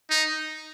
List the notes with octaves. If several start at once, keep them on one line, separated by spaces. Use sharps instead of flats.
D#4